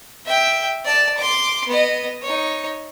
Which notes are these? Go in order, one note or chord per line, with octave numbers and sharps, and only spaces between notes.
E5 G5
D5 A5
C6 D6
B3 D#5
D#4 C#5